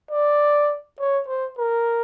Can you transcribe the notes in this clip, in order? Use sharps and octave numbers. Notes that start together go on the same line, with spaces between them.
D5
C#5
C5
A#4